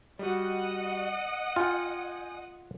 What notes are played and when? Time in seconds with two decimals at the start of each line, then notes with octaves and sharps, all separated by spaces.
0.19 G3 F#4 D#5 F#5 D#6
1.56 F4 G5 G#5